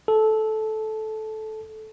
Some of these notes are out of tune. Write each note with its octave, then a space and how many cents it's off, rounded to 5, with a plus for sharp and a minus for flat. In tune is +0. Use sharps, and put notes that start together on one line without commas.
A4 -15